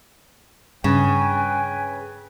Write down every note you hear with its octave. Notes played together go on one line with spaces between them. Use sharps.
G2 C#3 B4 G5 G#5